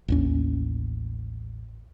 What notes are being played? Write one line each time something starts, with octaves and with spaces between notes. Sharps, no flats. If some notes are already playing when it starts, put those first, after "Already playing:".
A1 D#2 C#4